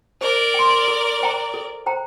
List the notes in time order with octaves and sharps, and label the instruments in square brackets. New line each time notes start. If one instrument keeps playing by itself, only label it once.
[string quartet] A#4 D5 [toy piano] C5
[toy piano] G5 C6
A4
C5 G5 A#5
A4
C5 G5 A#5